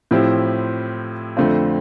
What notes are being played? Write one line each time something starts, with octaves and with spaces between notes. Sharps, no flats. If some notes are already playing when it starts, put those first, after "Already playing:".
A2 F3 C4 E4 G4
F2 D3 A3 C4 F4